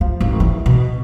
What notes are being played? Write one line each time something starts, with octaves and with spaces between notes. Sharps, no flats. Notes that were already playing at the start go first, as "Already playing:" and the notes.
F3
G#1
E3
B2